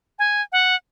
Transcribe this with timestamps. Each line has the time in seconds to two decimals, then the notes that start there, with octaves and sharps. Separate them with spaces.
0.19 G#5
0.52 F#5